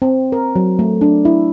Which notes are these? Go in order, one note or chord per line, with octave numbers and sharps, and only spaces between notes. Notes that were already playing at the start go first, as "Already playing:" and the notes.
C4
A#4
F#3
A3
D4
E4